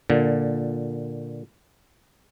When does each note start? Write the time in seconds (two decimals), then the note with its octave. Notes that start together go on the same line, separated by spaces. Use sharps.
0.10 A#2 D3